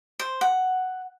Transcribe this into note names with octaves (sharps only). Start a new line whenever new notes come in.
C5
F#5